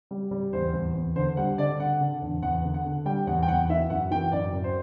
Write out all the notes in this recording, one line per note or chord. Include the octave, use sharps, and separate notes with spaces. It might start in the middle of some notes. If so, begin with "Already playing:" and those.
G3
G3
E2 C5
E2
E2
D3 C5
G3 F#5
D3 D5
D3 F#5
D3
E2
E2 F#5
D3
F#5
D3
G3 G5
E2 F#5
G5
E2 F#5
E3 E5
F#2 F#5
E3 G5
F#2 D5
F#2
C5